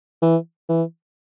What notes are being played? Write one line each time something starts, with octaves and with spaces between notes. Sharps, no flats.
E3
E3